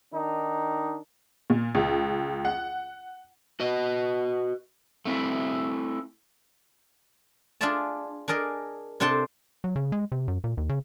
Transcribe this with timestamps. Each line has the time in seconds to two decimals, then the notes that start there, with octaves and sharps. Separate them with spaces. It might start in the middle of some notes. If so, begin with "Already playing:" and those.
0.13 D#3 D4 D#4
1.50 A#2
1.75 C#2
2.45 F#5
3.60 F#4 B4 D#5
5.05 A3 C4 E4
7.61 D4 F4 G#4 D5 E5 A5
8.28 D4 G#4 A#4 D5 D#5
9.00 C3 D4 A4 C5 G5 A5
9.64 F#3
9.76 C#3
9.92 G#3
10.12 C3
10.28 F#2
10.44 A#2
10.57 D#2
10.69 C#3